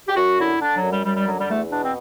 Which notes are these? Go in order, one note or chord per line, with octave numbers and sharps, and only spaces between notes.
G4
F#2 F#4
D3 E4
D3 D4
F#3
F#2
G3
F#2 G3
G3
D3 F#3
G3
E2 A3
B2 D4
C4